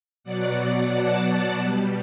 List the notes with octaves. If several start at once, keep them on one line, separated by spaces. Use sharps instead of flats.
B2 F#3 D5 F#5
D5 F#5
F#5 A5
B2 G3